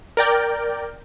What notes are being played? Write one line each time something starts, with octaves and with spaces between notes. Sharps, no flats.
A#4 D5 G5